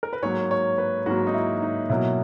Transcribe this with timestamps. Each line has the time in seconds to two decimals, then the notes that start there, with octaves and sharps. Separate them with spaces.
0.03 A#4
0.13 B4
0.22 G#2 F#3 A#3 C#5
0.51 C#5
0.78 B4
1.06 G#2 F#3 A#3 F#4
1.27 D#4
1.34 E4
1.62 D#4
1.89 B2 F#3 A#3 E4